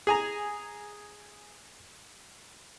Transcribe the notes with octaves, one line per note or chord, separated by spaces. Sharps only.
G#4 G#5 A#5